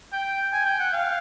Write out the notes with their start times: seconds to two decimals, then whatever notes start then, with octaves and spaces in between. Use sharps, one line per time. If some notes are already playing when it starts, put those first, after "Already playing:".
0.12 G5
0.53 G#5
0.65 G5
0.79 F#5
0.92 F5